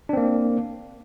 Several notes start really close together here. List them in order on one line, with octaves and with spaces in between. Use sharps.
D4 C4 A#3